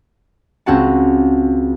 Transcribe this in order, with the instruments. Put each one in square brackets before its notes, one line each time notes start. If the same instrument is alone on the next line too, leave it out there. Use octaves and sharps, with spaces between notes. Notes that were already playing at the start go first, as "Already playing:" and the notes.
[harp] C#2 C4 C#4 F#4 F#5 A5